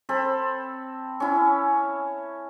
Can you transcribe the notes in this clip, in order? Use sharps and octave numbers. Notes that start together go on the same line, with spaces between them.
C4 A4 B5
C#4 E4